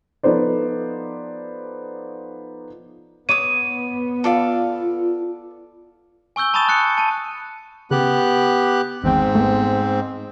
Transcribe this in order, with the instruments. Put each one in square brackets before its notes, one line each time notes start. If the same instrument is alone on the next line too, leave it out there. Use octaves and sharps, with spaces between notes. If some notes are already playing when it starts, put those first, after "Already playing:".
[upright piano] F3 B3 D#4 A4 C5 D5
[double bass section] B3 [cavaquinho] C#5 D6 D#6 [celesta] D#7
[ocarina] F4 [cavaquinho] A4 D5 F5
[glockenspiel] G#5 C#6 E6 G6 G7
A5 B5 C#6 D#6 A6 E7
D#6 F#6 A6 C#7
A5 D#7
[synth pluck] C#3 [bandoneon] B3 G4 F#6
[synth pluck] G#1 E2 G5 [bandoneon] G#2 C4
[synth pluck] A3 B3